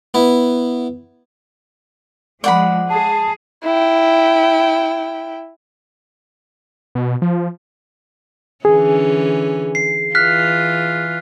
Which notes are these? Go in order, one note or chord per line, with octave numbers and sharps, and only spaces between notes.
B3 E4
F3 G#3 D5 F#5 B5
G#4 A5
E4 G5
B2
F3
D3 E3 C#4 G#4
C7
E3 F4 F6 F#6 B6